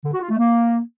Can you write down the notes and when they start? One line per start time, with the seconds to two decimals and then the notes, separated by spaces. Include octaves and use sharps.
0.05 D3
0.13 F#4
0.22 F4
0.30 A3
0.39 A#3